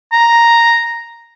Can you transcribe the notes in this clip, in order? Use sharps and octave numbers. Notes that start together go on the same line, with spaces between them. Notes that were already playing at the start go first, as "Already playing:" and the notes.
A#5